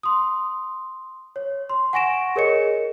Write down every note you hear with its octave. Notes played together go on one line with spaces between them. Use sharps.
C6 D#6
C#5
C6
F#5 G#5 C#6 A#6 D7 E7
G#4 A#4 C#5 D#5 C#7